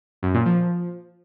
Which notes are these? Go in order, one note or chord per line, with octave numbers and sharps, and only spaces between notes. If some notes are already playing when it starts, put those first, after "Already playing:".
F#2
A#2
F3